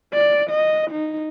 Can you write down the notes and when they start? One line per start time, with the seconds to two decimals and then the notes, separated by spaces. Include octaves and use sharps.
0.13 D5
0.50 D#5
0.91 D#4